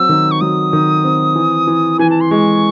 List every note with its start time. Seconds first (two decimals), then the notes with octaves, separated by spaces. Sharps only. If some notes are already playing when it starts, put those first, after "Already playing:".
Already playing: F#3 C4 E6
0.09 D#3
0.31 C#6
0.41 F#3 D#6
0.73 D#3
1.04 C4
1.35 E3
1.67 E3
1.99 E3 G#5
2.10 A5
2.21 C6
2.31 G#3 C#6